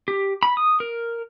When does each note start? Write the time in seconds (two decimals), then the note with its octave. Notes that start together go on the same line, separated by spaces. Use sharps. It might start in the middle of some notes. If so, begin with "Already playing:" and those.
0.08 G4
0.43 B5
0.57 D#6
0.80 A#4